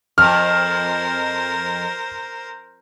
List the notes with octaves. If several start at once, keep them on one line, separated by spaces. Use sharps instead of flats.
F2 A#4 C5 F6